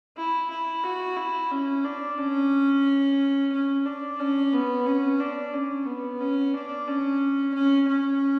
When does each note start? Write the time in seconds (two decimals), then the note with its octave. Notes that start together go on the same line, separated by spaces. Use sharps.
0.17 E4
0.50 E4
0.84 F#4
1.17 E4
1.51 C#4
1.85 D4
2.18 C#4
3.52 C#4
3.85 D4
4.19 C#4
4.53 B3
4.86 C#4
5.20 D4
5.53 C#4
5.86 B3
6.21 C#4
6.54 D4
6.88 C#4
7.54 C#4
7.88 C#4